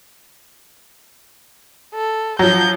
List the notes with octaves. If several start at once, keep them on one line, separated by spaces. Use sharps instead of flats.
A4
F3 F#3 G6